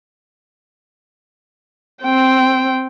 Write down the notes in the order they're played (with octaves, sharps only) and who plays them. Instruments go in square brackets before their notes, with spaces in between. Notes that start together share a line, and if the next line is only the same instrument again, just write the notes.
[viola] C4 G5